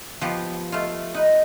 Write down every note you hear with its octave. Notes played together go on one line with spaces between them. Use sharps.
F3 B3 G4
A3 F4
D#4 B4